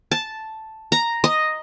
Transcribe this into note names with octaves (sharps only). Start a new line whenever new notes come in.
A5
A#5
D#5